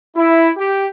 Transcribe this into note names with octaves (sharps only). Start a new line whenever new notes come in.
E4
G4